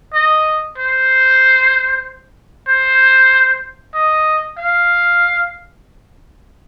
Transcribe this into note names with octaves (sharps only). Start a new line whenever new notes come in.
D#5
C5
C5
D#5
F5